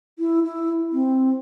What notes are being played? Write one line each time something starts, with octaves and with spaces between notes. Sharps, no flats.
E4
E4
C4